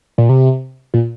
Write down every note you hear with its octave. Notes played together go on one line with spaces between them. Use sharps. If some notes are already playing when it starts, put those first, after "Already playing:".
A#2
C3
A#2